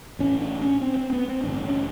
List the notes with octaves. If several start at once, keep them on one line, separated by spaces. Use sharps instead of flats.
A1 A2 C#4
D4
C#4
C4
C4
B3
C4
A1 G2 D3 D4
C#4